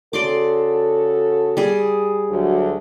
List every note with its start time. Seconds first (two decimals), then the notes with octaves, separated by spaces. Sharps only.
0.13 C#3 F#4 A4 D5 C6 D6
1.57 G3 G#4
2.30 D2 F#3